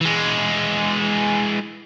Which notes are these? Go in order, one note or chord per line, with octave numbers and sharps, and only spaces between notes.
E3 G#3